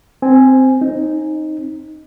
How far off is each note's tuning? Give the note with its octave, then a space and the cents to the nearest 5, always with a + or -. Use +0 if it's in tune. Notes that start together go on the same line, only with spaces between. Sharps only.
C4 -5 G#5 +0
C4 +35 D#4 +0